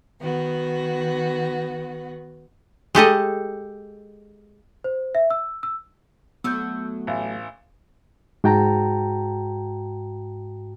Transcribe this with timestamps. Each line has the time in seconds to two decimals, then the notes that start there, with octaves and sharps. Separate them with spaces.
0.20 D#3 B3 F#4
2.95 G#3 G4 A4 D#5
4.84 C5
5.15 E5
5.30 E6
5.63 E6
6.44 F#3 A3 B3 E6 G6
7.07 A1 F5
8.44 G#2 F#4 G5 A5 A#5